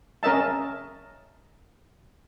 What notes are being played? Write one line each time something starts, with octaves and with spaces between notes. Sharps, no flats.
C#4 A#4 D#5 E5 A5